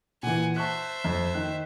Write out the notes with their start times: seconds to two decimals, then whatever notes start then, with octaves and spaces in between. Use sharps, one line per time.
0.23 A#2 E3 F#5 G#5
0.56 C5 E5 A5 C#6 F#6
1.04 F2
1.34 D#3 F#6